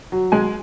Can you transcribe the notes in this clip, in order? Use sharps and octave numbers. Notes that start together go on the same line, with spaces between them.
F#3
G#3 G#5